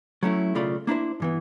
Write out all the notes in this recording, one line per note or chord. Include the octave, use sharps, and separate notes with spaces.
F#3 A3 C#4 E4
B1 C#3 A3 F4 D5 B5
A#3 D4 E4 C5
G2 E3 B3